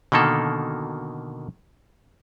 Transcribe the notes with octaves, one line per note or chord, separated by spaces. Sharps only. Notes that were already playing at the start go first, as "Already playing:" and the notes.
B2 D3 D#3 A#3 A4